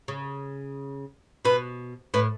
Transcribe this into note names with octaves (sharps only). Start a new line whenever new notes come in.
C#3
B2 B4
A2 B4